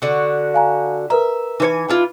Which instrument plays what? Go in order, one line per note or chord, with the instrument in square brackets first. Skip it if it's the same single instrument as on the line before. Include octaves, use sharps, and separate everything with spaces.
[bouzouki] D3 F#4
[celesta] F5 G#5 A#5
[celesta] A#4 B4 A#5 [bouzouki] E5
[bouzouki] E3 C5 G#5 [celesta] D#4 B4 C#7
[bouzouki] D4 E4 F4